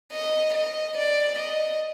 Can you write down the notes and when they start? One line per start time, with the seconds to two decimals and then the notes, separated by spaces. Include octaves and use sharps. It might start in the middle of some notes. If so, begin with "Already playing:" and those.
0.12 D#5
0.54 D#5
0.97 D5
1.39 D#5